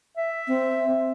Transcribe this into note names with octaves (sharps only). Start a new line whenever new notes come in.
E5
C4